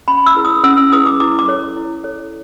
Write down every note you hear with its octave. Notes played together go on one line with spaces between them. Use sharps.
C#4 B5
E6
E4 G#4 B4
D#6
C#4 E6
E6
E4 G#4 B4 D#6
D6
E4 D6
D6
A4 C#5
E4
A4 C#5